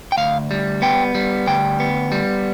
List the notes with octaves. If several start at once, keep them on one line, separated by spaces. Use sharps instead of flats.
G5
D2 F5
G3
B3 G5
G3
D2 G5
B3
G3